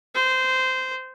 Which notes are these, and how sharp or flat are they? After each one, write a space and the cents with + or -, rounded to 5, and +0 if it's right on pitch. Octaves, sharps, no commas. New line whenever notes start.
C5 -15